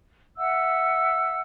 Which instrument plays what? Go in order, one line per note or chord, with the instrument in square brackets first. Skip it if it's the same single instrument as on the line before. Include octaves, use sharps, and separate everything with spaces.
[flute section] E5 F#5 E6